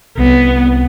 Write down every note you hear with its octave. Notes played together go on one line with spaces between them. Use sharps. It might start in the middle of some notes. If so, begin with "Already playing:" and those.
C2 B3